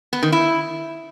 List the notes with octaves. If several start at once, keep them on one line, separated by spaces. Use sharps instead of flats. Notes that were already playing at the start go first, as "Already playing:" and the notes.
B3
D#3
E4